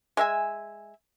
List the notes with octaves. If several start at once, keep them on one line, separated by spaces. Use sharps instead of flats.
G#3 E5 G#5